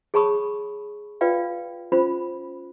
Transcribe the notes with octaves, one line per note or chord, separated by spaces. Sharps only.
G#4 C#5 A5 B5 C#6 D#6
F4 B4 D5 F5 G5
C#4 F4 C5 B5